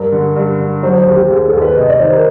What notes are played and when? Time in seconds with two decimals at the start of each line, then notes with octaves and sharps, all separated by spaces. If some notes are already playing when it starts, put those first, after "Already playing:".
Already playing: G2 A#4
0.12 D3
0.36 G2
0.59 D3
0.83 F#3 C5
0.98 C5
1.06 D#2
1.14 G4
1.30 D#2 G#4
1.46 A4
1.53 D#2
1.61 B4
1.76 C3 D#5
1.89 D5
2.00 D#3 C5
2.13 A#4